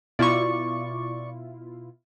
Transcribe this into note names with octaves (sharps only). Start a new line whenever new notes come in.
B2 E4 F4 D5 C#6